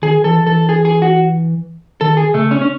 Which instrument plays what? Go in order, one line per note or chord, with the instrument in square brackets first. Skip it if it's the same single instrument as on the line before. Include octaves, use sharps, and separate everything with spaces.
[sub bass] D#3 [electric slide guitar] G#4
[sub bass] E3 [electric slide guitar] A4
[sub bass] E3 [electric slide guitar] A4
[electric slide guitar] G#4
G#4
F#4
[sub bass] D#3 [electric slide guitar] A4
[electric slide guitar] G#4
[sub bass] C#3 [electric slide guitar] A3
[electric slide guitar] C#4
C#4